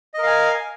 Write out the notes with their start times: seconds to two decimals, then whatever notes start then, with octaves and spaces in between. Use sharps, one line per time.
0.14 D#5
0.18 A#4
0.22 F5
0.27 G#5